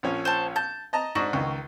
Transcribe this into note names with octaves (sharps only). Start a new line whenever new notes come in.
A#1 F3 C#4
C5 A5
A5 G6
D#5 A5 A#5
G#2 D4 F#4
C#2 D#3